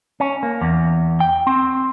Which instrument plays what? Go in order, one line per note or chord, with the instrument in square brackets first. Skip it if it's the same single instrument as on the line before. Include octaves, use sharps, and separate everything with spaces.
[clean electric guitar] C#4
A#3
E2
G5
C4